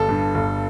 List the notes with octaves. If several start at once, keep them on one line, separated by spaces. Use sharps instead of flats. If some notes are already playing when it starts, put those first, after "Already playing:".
Already playing: G1 A4
G2
G1